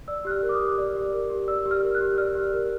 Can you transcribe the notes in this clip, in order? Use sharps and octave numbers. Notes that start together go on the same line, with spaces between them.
D5 E6
G4 F#6
F6
A#4
D6
D#6
G4
D5
G4
A#4
G4
D5 E6
G4
F6
A#4
F#6
G4
D5 F6
G4
A#4